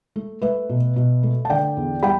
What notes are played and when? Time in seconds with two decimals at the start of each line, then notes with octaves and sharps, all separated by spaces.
0.16 A3
0.42 A3 B4 E5
0.69 B2
0.96 B2
1.23 A3
1.45 A5
1.50 D3 D5 G5
1.77 E2
2.03 G3 G5 B5